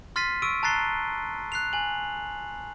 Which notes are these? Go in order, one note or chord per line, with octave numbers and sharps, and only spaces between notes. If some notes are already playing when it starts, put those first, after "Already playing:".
C6 F6 A6 B6 C7 D#7
C#6 E6 D7 D#7
A5 A#5 F#6 A6 C7 G7
F#6 C7 F7
G#5 F#7